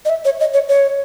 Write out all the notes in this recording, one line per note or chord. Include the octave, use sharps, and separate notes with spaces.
D#5
E5
C#5
D#5
C#5
C#5